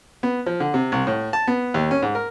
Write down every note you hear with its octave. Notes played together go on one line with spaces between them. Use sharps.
B3
F3
D3
C3
C2
A2
A5
B3
D#2
C#4
G#2
A#4